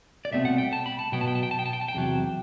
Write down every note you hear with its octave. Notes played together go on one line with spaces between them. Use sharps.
D5
C2 B2 A3 C4 E5
F#5
G5
A5
B5
A5
B2 F#3 B3 G5
A5
G5
A5
G5
A5
G5
A5
G5
A5
G5
E2 C3 F#3